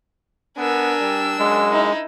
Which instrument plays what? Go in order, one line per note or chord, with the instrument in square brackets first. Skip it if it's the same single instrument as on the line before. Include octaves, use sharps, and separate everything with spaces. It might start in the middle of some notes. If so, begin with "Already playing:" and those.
[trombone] B3 [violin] D4 E6 [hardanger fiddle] A#4 G#5
[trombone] G3
[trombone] F#2 [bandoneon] G#3
[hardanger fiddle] D#4 E4